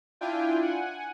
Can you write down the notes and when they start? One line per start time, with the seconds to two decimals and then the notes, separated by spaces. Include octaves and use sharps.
0.21 D4 E4 F4 G5 G#5
0.62 F#5 G#5